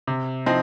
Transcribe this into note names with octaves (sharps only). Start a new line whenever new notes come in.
C3
F3 C4 D#4